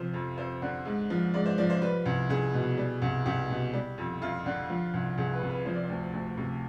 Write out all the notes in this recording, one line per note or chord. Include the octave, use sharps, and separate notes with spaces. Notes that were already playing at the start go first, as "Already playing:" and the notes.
Already playing: C3 F3 C5
F2
F2 C5
D3
G#2
F3
G#2 D5
C5
F3 D5
C5
G3 B4
C2
C2 G#4
B2
G3
C2
C2 G4
B2
G3
F2
F2 F4
D3
F3
C2
C2 G#4
B4
C3
B4
F3 C5
D5
C5
D2
D2
C3